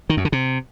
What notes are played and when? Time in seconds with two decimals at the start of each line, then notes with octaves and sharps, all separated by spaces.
0.10 D#3
0.17 F#2
0.25 D3
0.32 C3